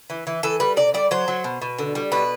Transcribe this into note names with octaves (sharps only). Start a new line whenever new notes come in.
E3
E3
E3 A4
G3 B4
C3 D5
G3 D5
F#3 C5
F#3
B2
B2
D3
G3
B2 B4